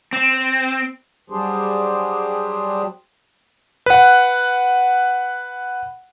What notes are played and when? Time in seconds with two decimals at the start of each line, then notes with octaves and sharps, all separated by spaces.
0.13 C4
1.30 F#3 G3 D4 G4 G#4 C5
3.86 B4 F#5